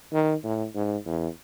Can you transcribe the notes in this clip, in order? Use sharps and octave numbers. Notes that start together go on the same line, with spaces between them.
D#3
A2
G#2
E2